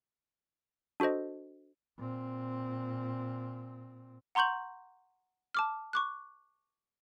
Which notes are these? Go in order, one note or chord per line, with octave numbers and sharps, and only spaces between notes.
D4 F#4 A4 C5 D#5
A#2 C4
F#5 A#5 C6 C#6 G6 F#7
A5 D6 F6
C#6 D6 F#6